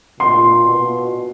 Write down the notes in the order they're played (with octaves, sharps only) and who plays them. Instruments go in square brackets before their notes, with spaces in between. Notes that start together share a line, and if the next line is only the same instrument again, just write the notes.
[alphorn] A#2 [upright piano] C6
[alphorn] B2